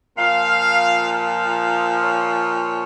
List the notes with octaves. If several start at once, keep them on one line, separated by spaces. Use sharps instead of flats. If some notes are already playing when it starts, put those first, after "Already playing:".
A#2 F3 F5
F5
C#5